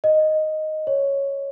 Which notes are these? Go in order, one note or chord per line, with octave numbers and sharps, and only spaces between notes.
D#5
C#5